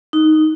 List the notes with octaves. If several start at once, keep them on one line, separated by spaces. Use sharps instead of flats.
D#4